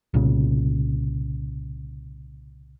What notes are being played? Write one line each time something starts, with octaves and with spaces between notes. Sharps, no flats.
C2 A#2 C#3